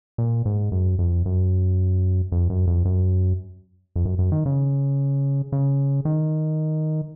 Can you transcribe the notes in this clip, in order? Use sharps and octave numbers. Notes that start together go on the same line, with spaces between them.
A#2
G#2
F#2
F2
F#2
F2
F#2
F2
F#2
F2
F#2
F#2
D#3
C#3
C#3
D#3